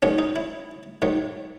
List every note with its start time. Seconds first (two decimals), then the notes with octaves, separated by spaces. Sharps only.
0.02 G#2 D#3 F#3 C#4
0.18 D#4
0.36 E4
1.02 G#2 D#3 F#3